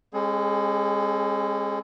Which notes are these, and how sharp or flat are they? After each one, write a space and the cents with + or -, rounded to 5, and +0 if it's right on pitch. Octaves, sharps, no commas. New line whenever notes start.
G#3 -30 C4 +45 G#4 +40